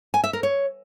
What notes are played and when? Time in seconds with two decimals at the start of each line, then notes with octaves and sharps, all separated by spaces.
0.14 G#5
0.24 E5
0.33 A#4
0.43 C#5